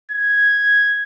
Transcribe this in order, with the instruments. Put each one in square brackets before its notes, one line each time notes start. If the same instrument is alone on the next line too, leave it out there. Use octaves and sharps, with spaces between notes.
[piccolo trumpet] G#6